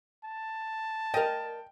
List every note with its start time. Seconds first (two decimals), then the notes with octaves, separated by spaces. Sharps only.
0.24 A5
1.14 A#4 D#5 G5